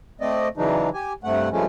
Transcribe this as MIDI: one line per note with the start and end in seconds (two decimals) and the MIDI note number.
0.21 0.48 57
0.21 0.48 60
0.21 0.48 74
0.21 0.48 75
0.57 0.89 49
0.57 0.89 52
0.57 0.89 54
0.57 0.89 62
0.57 0.89 63
0.94 1.13 67
0.94 1.13 80
1.24 1.49 43
1.24 1.49 48
1.24 1.49 57
1.24 1.49 78
1.52 1.66 43
1.52 1.66 49
1.52 1.66 53
1.52 1.66 56
1.52 1.66 57
1.52 1.66 61